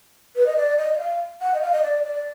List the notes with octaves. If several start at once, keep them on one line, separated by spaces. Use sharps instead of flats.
B4
D#5
D5
D#5
D#5
F5
F#5
D#5
F5
D#5
D5
D5